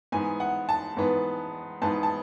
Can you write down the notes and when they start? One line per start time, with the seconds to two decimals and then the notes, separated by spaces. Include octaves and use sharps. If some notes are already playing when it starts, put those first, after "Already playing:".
0.12 G#2 E3 B3 G#5
0.40 F#5
0.69 A5
0.97 G#2 E3 B3
1.82 G#2 E3 B3 A5
2.03 A5